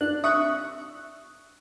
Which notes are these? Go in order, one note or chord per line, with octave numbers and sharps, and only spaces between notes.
D4 F#6
E5 C#6 D#6 F#6